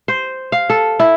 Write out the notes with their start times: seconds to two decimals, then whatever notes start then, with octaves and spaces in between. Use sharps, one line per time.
0.08 C5
0.52 F5
0.70 A4
1.00 E4